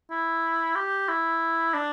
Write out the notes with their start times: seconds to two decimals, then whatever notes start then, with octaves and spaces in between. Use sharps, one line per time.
0.10 E4
0.76 G4
1.08 E4
1.74 D4